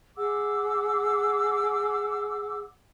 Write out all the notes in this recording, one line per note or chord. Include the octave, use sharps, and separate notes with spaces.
G#4 F#5 D6 E6